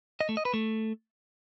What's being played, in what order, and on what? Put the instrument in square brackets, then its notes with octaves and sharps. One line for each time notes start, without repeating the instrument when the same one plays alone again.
[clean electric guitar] D#5
A3
D#5
B4
A3